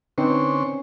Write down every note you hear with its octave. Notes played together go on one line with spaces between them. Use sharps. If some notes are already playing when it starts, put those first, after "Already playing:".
D3 C4 C#4 D#4 B4 C5 C#6